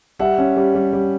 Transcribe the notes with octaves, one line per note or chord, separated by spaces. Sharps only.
G3 E5 F#5
C#4
G3
G3
G3